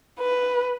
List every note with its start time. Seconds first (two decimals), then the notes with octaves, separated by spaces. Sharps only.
0.20 B4